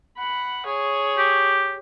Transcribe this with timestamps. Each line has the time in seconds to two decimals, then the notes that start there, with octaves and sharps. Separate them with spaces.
0.17 F#5 B5
0.66 G#4 C#5
1.18 G4